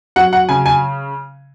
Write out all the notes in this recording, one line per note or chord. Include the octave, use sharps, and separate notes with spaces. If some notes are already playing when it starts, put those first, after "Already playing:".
F#3 F#5
F#5
C#3 G#5
G#5